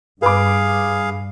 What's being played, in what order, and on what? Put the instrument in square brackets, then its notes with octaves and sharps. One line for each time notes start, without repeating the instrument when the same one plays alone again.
[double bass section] G2 [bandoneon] G#4 F5 [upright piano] B4 D6